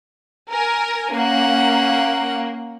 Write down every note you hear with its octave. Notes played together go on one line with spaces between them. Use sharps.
A#4 G#5
A#3 C#4 F#5